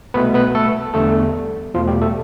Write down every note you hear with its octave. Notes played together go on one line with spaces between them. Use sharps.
C2 B2 A3 B3 B4
B3 B4
A3 A4
E2 D3 G3 A3 B3 A4
E2 B2 F3 A3 F4
G3 G4
A3 A4